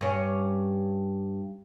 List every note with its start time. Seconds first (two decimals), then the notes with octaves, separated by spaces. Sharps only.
0.01 G2 C#4